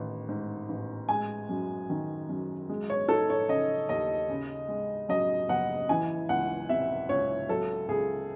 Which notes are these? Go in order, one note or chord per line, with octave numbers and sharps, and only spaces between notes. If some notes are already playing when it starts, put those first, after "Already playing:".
Already playing: A1 D#3
G#2
A1
G#3 G#5
F#2
D#3
F#2
G#3
C#5
D#4 A4
C#5
C#3 D#5
D#2 D#5
C#3
G#3
F#2 D#5
F#1 F#5
E3 G#5
C#2 F#5
C3 E5
C#2 C#5
F#3 A4
C#2 G#4